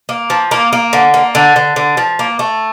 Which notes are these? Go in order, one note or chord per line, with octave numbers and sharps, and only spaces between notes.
A#3
F3
A#3
A#3
D3
A#3
D3
D3
D3
F3
A#3
A3